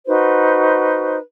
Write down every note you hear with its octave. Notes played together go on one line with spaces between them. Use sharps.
D#4 F#4 B4 C5